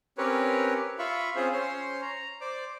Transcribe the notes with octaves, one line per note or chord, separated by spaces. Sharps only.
C4 C#4 G4 A#4 B4 C#5
F4 E5 F5 B5 C#6
C4 C#4 F4 G#4 C5
C#4 C5 C#5 C6
A#5
C5 D5 D6